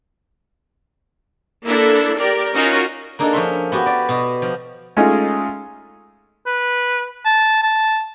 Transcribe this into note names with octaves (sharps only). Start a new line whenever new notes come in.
A#3 D4 E4 A4
G4 A#4 D5
C#4 D#4 F4 F#4 A#4
A#3 D4 D#4 G#4 A4
F3 C#4 E5 C6
B3 F#4 G4
D5
B2
F3
G#3 A3 C#4 D#4 F4 G#4
B4
A5
A5